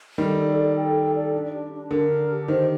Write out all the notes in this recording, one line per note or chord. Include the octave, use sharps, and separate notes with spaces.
D#3 G3 A4
D5
A4
G5
A4
D5
D4
G4
D4
D3 A#4
D4
G4
D#3 C5